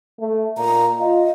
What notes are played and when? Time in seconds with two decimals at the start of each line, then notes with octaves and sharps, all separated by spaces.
0.20 A3
0.58 A#2 A#5
0.99 F4 D#5